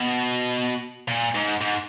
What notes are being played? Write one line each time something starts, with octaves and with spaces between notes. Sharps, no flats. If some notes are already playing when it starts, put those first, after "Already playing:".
Already playing: B2
A#2
G#2
G#2